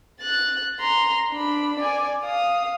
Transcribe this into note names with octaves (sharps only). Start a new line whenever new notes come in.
F#6 A6
A#5 C6
D4 B5
D5 G#5
F5 D#6